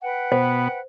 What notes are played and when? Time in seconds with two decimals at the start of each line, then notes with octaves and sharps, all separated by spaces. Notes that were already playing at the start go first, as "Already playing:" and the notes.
0.02 B4 F#5 G5
0.32 B2 B3 C5